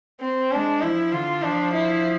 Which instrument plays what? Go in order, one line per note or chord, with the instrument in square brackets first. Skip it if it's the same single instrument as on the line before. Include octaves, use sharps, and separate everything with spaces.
[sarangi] C4
[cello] G#3 [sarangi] D4
[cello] F3 [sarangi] E4
[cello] D3 [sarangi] F4
[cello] F3 [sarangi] D4
[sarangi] E4